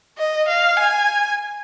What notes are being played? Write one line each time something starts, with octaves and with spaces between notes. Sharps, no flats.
D#5
F5
G#5